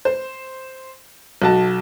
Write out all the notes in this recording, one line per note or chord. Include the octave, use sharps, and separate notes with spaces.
C5
B1 F#4 A5